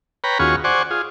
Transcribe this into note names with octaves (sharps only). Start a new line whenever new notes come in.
B4 C#5 G5 A#5 B5
D#2 C#4 F4 F#4 G#4 C#6
C5 D5 F#5 G#5 C#6
F4 G#4